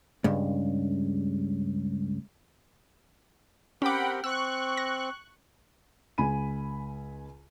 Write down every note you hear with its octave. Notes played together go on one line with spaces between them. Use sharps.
C#2 G2
C4 C#4 G4 A#4 F#5 G5 B5 D6
C4 C#6 E6 F#6
A#6
C#2 G#5 B5 D#7